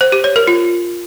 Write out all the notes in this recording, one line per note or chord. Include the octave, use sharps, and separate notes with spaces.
C5
G4
C#5
A#4
F4